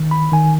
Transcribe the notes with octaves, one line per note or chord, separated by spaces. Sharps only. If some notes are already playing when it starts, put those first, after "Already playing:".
Already playing: D#3
B5
D#3 G#5